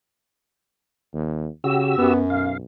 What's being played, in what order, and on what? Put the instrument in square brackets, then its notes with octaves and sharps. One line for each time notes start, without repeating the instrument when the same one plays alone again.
[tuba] D#2
[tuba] C#3 [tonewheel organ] F#4 G4 E6
[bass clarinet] F#2 [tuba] B3
[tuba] B1 [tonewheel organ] F5